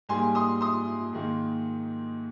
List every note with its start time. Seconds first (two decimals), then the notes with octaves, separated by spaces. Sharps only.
0.09 G#2 G3 A#3 G#5 C6
0.35 C6 D#6
0.61 C6 D#6
1.13 G#2 D#3 A#3